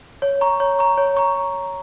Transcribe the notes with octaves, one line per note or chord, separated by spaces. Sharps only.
C#5
A#5 C#6
C#5
A#5 C#6
C#5
A#5 C#6